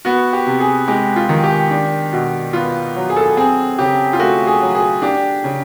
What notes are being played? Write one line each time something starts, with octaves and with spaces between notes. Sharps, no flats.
B3 F#4
G4
C3
G#4
G#3 G4
F4
D#3
G4
D4
B2
B3 F4
F#3
G#4
A4
G#4
C4 G#4
C#3 G4
F4
A3 F#4
G#4
F#3
G#4
D4 G4
C#3